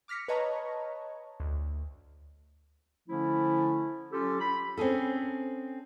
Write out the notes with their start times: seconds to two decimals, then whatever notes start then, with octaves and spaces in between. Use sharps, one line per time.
0.08 D6 F6 A#6 B6 C#7
0.28 B4 C#5 D#5 A5 A#5 C#6
1.40 D2
3.09 D3 F3 A3 C#4 E4
4.12 F#3 C#4 F4 G4 A4
4.41 B5
4.77 C4 C#4 G#4 A4